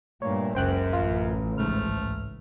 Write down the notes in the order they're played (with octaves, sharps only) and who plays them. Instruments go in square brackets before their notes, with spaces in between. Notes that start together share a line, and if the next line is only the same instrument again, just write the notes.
[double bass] G2 A#3 [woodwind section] A#2 A3 [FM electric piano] C#5
[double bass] F#1 C#2 [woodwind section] F#2 [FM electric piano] C5 G5 F#6
[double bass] A1 [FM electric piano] F4
[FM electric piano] C#2 G#2 [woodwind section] F3 A3 F6